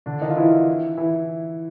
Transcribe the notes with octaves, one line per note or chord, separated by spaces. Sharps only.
D3 D4
D#3 D#4
F4
E3 E4
E3 E4